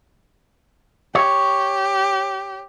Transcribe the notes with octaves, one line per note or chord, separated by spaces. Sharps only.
G4 C#5